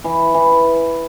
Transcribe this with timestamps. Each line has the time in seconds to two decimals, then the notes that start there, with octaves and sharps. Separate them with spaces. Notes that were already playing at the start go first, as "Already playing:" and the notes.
0.04 E3
0.34 E3